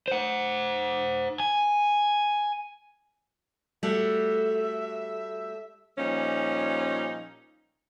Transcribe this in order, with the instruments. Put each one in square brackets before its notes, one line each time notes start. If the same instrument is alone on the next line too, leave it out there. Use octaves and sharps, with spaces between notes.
[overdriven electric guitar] C5 F#5
G#5
[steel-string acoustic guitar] G3 A3 F#4 [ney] A4 [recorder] E5
[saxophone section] A#2 F3 G3 C#4 D#4